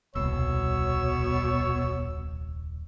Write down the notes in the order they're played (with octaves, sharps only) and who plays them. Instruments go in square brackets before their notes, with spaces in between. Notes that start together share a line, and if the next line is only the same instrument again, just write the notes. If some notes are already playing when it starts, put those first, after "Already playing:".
[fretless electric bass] D#1 C2 [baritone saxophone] B2 [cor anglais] C#5 [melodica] E6